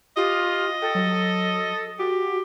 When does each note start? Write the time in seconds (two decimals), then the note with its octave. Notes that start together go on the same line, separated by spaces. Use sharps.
0.17 F4 G4 D#5
0.82 A4 G5
0.95 F#3
1.99 F#4 G4